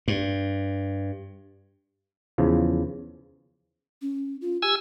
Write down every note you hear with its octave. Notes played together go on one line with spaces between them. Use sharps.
G2
E2 C#3 F3
C#4
F4
G4 G#5 E6